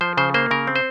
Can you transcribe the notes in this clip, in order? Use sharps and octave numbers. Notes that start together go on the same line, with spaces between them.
F3 C5
C#3 C5
A#3 C5
C#3 A#4
C4
C5